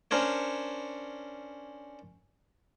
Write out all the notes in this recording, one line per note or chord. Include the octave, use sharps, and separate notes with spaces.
C#4 D4 A#4 C5 C#5